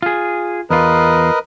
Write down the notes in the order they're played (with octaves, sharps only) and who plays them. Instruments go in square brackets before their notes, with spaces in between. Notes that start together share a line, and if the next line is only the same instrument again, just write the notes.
[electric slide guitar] F4 G#4
[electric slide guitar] E2 F4 [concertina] A#4 B4 D#5